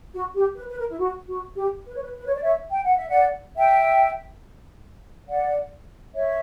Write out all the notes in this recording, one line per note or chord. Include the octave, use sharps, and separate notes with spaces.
F#4
G4
B4
B4
A#4
E4
F#4
F#4
G4
B4
C#5
B4
B4
C#5
D5
C#5 E5
G5
F#5
E5
D5 F#5
E5 G5
D5 F#5
C#5 E5